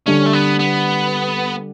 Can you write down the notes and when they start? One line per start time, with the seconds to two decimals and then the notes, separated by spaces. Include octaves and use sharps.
0.06 D3 G3 C#4 D4
0.26 A3
0.33 B3
0.59 B3